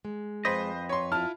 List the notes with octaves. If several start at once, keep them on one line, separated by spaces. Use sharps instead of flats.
G#3
F2 B4 C5 D#5
C#5 C6
E4 F4 A5 F6